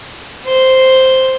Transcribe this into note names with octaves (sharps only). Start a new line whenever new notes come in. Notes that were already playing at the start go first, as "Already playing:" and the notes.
C5